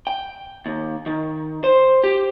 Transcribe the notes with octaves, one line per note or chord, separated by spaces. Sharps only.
G5
D#2
D#3
C5
G4